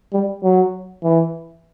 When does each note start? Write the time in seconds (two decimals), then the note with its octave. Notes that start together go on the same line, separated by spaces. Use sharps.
0.13 G3
0.43 F#3
1.03 E3